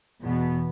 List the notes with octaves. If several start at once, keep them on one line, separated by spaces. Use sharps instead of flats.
E2 B2 B3